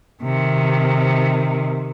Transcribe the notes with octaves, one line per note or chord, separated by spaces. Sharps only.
C3 D#3